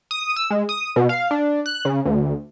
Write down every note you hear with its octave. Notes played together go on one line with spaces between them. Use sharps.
D#6
E6
G#3
D#6
B2
F5
D4
F#6
C#3
D2